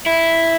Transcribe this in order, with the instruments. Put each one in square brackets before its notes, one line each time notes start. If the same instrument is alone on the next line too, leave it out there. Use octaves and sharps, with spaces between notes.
[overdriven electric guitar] E4